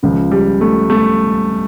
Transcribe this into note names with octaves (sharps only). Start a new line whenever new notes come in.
C#2 C#3 F3
G3
A3
A3